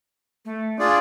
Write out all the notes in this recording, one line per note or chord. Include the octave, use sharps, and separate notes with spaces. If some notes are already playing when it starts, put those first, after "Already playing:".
A3
D4 F4 G#4 D5